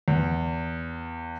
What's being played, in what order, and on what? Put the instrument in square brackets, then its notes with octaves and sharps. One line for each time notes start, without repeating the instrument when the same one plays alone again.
[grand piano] E2